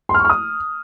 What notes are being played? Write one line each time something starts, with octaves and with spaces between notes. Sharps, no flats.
C6
F6
C#6
F6
D#6